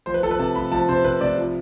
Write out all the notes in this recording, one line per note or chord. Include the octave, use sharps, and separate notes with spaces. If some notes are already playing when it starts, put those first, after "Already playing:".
F3 C5
B4
F3 A4
B4
C3 A5
F3 B5
F3 A5
C3 C5
C3 B4
C3 D5
F3